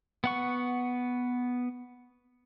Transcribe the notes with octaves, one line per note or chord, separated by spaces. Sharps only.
B3 F#5 C#6